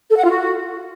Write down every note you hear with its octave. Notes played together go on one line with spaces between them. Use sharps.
A4
F#5
F4
F#4